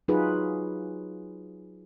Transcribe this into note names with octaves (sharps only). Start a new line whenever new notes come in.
F#3 D#4 F4 F#4 G#4 B4